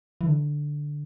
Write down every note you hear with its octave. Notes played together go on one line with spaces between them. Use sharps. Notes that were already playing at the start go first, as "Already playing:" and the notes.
E3
D3